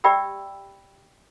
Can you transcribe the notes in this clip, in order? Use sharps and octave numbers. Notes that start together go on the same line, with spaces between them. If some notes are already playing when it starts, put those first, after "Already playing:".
G4 D5 E5 G5 B5 E6